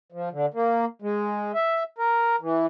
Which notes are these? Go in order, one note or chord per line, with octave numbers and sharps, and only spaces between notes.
F3
D3
A#3
G#3
E5
A#4
E3